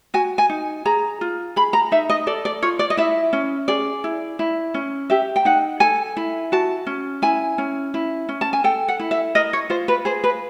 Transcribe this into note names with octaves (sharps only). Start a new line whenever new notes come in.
F#4 G#5
G#5
D#4
G#4 A#5
F4
G#4 B5
A#5
D#4 E5
D#5
A4 D5
D5
F4 C#5
D5
D#5
E4 E5
C#4
G#4 D5
E4
E4
C#4
G4 E5
G5
D#4 F#5
A4 G#5
E4
F#4 A5
C#4
E4 G#5
C#4
E4
C#4
A5
G#5
A4 G5
F#5
E4
E5
A#4 D#5
C#5
F4 C5
B4
G#4 C5
B4